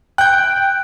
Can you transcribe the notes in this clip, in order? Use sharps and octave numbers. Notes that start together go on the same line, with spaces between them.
G5 F#6 G6